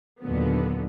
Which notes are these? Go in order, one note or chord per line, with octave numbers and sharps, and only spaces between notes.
D#2 A#2 D3 F#3 B3